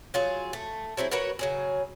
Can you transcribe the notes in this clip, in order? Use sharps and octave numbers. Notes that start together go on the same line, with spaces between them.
F#3 F4 G#4
A3
F#3 C4 E4 G#4
F#4 A#4 B4 C#5
C#3 F#3 G#4